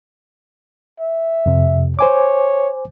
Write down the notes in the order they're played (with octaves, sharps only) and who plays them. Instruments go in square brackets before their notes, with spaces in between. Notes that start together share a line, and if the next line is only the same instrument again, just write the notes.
[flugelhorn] E5
[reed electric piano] F2 C3
[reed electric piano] C5 G#5 D6 [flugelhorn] C#5